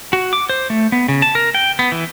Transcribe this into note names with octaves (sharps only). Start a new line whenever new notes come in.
F#4
D6
C5
A3
B3
C#3
A5
A#4
G5
B3
E3